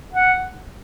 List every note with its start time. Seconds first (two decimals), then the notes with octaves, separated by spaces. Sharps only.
0.14 F#5